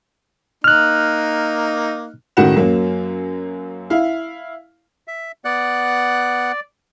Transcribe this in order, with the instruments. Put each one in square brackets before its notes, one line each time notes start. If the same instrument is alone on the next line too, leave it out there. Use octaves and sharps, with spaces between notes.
[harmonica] A#3 D#4 [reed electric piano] F6 F#6
[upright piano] C#2 A2 D#3 F#4 F#5 E7
F#2 F#3 A#3
E4 F5
[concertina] E5
[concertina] B3 F#5 F#6 [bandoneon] D5